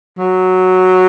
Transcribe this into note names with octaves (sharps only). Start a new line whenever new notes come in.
F#3